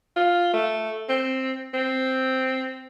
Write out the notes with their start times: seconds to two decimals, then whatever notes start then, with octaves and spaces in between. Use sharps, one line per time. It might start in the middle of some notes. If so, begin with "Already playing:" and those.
0.16 F4
0.54 A3
1.09 C4
1.74 C4